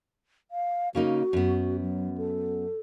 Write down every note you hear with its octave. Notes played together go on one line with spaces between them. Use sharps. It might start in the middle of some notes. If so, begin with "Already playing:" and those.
F5
C#3 A#3 D#4 F#4
F#2 B3
F#3
A4